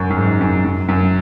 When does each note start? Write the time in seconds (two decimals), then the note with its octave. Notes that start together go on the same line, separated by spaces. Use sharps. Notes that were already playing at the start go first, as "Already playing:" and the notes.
Already playing: F#2
0.10 F#2
0.17 G#2
0.41 F#2
0.65 F#2
0.89 F#2